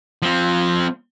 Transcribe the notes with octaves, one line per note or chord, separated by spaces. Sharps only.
F3 C4